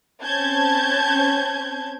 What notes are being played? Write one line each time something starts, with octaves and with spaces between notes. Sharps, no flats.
C4 C#4 A5 G6 G#6